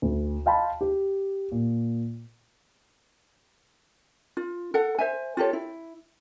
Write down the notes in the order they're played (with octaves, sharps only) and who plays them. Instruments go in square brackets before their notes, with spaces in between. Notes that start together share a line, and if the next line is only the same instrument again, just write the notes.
[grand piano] D2
D#5 F5 G5 A5 B5 C6
G4
A#2
[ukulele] F4
A4 F#5
C5 E5 G#5
F4 G4 A4 C#5
E4